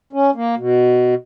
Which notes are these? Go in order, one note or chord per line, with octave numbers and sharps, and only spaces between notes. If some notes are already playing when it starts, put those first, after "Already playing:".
C#4
A#3
B2